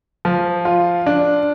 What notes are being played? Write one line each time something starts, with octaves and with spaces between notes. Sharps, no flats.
F3
F4
D4